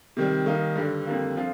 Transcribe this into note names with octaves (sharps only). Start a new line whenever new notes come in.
C3 D#3 G3
D#3 G3 A#3 D#4
G2 D3 G3 D4
F2 D3 G3 A#3
D3 F3 C4 F4